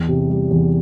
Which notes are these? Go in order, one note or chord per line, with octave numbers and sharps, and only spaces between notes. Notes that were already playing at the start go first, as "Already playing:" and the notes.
Already playing: E2
C3
G3
E2